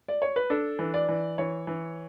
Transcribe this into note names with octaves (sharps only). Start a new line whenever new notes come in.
D5
C#5
B4
D4 A4
E3
D5
E3
E3 C#5
E3